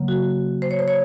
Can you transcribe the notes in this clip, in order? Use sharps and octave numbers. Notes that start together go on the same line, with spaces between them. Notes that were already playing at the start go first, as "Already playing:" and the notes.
Already playing: C#3 F#3 A#3
F#4
C5
C#5
C5
C#5